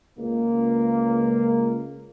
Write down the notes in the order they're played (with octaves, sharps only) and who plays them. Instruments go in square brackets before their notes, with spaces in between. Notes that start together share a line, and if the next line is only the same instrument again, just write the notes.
[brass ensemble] C#2 A#3